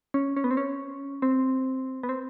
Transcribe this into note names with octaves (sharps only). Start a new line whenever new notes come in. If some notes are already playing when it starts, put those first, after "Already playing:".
C#4
C#4
B3
C4
C#4
C4
B3
C4